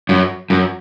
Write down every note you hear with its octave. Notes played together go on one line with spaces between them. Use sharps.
F#2
F#2